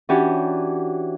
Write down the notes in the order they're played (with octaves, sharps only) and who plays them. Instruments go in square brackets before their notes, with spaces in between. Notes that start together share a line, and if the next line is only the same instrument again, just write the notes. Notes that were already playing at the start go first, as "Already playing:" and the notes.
[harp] E3 C#4 D4 F#4 G4